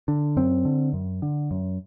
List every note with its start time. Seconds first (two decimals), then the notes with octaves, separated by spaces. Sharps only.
0.08 D3
0.37 F#2 C4
0.65 D3
0.93 F#2
1.22 D3
1.51 F#2